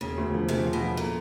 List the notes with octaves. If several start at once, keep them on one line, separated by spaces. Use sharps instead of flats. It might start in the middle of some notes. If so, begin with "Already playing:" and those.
E1 C#3
D2
F3
C3 F3
F3
B2
F3
A#2 A3